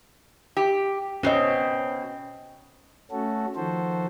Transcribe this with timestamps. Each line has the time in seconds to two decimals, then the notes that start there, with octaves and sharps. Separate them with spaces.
0.57 G4
1.23 B2 C4 C#4 D#5
3.11 A3 C#4 F#4 A4
3.56 D#3 F3 F#4 A4 C5